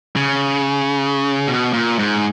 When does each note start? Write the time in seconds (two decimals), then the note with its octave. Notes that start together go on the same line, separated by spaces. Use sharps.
0.16 C#3
1.48 B2
1.73 A#2
1.99 G#2